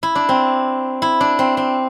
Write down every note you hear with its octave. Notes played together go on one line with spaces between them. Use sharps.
E4
D4
C4
E4
D4
C4
C4